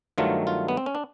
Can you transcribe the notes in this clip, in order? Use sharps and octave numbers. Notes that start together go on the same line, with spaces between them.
G2 D#3 F#3 A3 F4
F4
B3
C4
C#4
D4